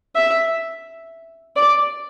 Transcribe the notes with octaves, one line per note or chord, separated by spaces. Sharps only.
E5
D5